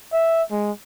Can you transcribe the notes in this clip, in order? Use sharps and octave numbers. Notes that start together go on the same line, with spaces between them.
E5
G#3